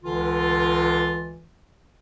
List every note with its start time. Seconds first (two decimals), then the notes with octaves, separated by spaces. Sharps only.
0.03 C#2 D3 E3 F4